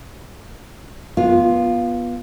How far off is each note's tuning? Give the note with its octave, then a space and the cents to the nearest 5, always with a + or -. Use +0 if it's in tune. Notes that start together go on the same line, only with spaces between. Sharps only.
B3 -20 F4 +0